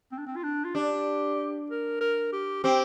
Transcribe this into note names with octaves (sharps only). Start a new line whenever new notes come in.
C4
D4
C4
F4
D4
F4
D4 G4
A#4
A#4
G4
C4 G4